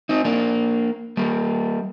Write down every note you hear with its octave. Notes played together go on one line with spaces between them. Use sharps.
C4 D#4
A#3 D4
G3 A#3